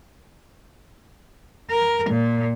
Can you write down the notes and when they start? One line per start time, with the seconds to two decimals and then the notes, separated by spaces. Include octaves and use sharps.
1.71 A#4
2.10 A#2